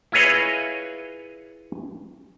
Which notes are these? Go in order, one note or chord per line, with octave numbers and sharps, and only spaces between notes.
E4 F4 G#4 B4 C#5 D#5